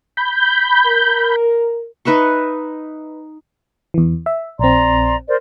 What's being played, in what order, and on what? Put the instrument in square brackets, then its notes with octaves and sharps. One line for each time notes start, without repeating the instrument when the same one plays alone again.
[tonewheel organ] B5 G6
[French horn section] A#4
[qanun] D#4 B4 E5 C#6
[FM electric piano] E2 E3
E5
[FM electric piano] A#1 C4 [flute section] D5 A#5 C6
[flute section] A#4 C5 D5